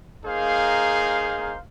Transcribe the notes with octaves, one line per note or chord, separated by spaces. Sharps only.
A#3 D#4 G#4 C5 F5